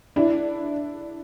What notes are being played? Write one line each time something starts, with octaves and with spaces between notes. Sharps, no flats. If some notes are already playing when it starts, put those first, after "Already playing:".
D4 E4